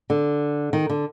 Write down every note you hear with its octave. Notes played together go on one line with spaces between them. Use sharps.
D3
D#3
D3